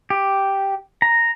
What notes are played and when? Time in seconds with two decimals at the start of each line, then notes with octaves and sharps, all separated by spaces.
0.10 G4
1.02 A#5